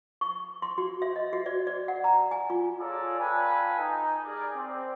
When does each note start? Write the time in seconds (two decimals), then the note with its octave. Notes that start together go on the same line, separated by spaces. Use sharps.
0.21 C#6
0.62 C6
0.78 F#4
1.02 E5
1.16 D#5
1.33 F#4
1.46 D5
1.67 D5
1.88 F#5
2.04 A#5
2.31 G#5
2.50 F4
2.79 F4 G#4 A4 C#5 D5 A#5
3.19 F4 A4 B4 G5 G#5
3.78 D#4
4.25 G3 G#4 A#4 D5
4.56 C4